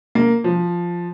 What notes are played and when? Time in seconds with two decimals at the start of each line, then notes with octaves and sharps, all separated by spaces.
0.15 A#3
0.44 F3